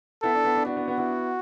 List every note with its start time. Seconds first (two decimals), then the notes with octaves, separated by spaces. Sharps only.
0.23 B3 E4 A4
0.34 D4
0.45 B3
0.55 D4
0.66 D4 F#4
0.77 B3
0.88 B3
0.98 B3 E4